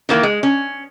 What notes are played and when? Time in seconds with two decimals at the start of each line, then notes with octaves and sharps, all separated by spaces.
0.09 D#3 E3 A#3
0.23 G#3
0.43 C#4